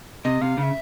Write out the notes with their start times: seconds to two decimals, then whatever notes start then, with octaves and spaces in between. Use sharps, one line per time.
0.24 C3 D#5
0.42 C3 F5
0.58 C#3 F5
0.63 E5